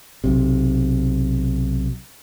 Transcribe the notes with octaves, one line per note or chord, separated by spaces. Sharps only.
B1 C3